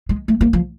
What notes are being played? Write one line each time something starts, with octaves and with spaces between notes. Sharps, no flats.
G#3
A3
A#3
F3